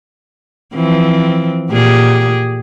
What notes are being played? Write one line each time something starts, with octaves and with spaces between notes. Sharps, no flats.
E3 F3 C4
A#2 G4 G#4